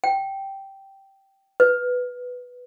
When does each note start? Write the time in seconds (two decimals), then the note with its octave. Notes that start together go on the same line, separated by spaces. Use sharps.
0.04 G5
1.60 B4